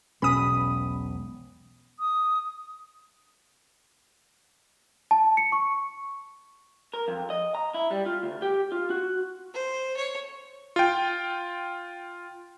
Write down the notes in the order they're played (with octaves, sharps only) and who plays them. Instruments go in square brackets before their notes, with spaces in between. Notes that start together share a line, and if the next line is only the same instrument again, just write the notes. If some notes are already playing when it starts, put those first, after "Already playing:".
[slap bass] E1 B1 G#3 [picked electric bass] B2 C#4 [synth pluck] B5 D#6
[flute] D#6
[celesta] A5
C#7
C#6
[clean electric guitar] A#4
F2
D#5
A#5
E4
G3
F4
D2
G4
F4
F#4
[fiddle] C5
C#5
[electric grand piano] F4 G5